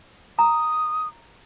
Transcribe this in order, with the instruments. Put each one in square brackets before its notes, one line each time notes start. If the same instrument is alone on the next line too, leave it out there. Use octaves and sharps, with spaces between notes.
[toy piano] A#5 [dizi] D#6